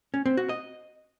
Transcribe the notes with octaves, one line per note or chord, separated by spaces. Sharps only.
C#4
C4
F#4
D#5